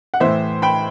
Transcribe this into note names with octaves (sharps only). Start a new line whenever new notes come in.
F#5
A2 E3 C5 E5
G5 B5